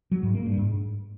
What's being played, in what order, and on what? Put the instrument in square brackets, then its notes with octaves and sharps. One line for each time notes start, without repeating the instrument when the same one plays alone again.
[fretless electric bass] F#3
G#2
A#3
G2
G#2